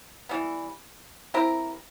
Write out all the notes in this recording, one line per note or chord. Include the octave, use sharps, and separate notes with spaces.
E3 G3 B3
C4 E4 G4 A#4